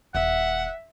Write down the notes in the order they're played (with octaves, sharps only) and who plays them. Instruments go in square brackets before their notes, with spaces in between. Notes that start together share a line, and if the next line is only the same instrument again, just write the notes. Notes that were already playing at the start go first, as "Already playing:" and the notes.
[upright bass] D#1 [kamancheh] E5 [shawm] F#5